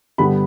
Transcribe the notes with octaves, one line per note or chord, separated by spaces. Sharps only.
G2 D3 G3 B3 B5